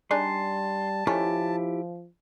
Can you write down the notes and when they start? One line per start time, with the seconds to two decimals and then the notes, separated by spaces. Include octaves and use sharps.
0.11 G3 D4 D#4 G#4 A5 C6
1.07 D#3 F3 A3 C#4 E4 G4